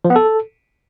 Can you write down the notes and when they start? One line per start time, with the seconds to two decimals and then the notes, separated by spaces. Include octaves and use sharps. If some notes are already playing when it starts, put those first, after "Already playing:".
0.05 F3
0.10 B3
0.16 A4